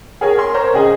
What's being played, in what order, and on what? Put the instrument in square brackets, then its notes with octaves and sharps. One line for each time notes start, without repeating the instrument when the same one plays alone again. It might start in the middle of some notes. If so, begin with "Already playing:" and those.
[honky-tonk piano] G#4 A#4 C#5 G#5
A#4 C6
A#4 C5 C#5 A#5 C6
C#2 C#3 G#4 D#5 G#5